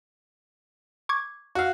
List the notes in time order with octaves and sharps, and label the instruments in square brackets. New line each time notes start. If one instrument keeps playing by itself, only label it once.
[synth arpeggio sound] C#6 D6 G#6
[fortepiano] F#4 F5